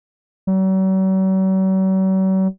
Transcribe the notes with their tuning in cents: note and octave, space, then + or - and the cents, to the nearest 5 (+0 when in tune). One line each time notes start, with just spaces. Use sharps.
F#3 +45